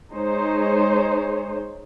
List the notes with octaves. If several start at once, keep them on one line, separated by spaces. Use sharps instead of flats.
G#3 D#4 C5 C#5